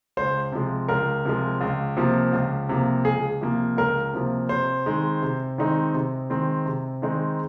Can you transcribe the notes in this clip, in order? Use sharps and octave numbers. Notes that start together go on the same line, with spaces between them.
C#2 C5
C3 F3 G#3
C#2 A#4
C3 F3 G#3
C#2
C3 F3 A#3
C#2
C3 F3 A#3
C#2 G#4
C3 F3 A#3
C#2 A#4
C3 F3 A#3
C3 C5
D#3 G#3 C4 D#4
C3
D#3 G#3 C4 D#4
C3
D#3 G#3 C4 D#4
C3
D#3 G#3 C4 D#4